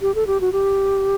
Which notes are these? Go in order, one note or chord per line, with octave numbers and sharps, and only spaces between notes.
G4
A4
G4
F#4
G4